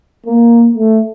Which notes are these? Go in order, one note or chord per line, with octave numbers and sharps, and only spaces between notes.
A#3
A3